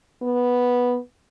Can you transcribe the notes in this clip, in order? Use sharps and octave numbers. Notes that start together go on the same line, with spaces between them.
B3